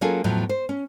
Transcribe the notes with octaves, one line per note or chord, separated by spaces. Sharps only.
F#3 A#3 C#4 F4 G#4 A4
E2 A2 F3 F#3
C5
C#4